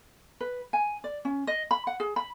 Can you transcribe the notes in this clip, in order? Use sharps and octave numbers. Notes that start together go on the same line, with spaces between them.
B4
G#5
D5
C#4
D#5
B5
F#5
G#4
B5